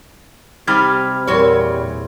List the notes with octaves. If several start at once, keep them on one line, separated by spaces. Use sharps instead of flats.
C3 G3 D#4 B5 F6 G#6
E2 A#2 G3 C4 C#5